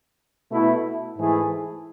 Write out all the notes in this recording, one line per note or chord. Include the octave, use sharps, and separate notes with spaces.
B2 A3 E4
G#2 E3 A3 E4 G#4